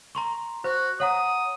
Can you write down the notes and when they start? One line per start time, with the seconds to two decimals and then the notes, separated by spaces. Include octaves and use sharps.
0.15 A#5 C6 C#6
0.64 F#4 C5
1.00 C#5 F#5 A#5 D#6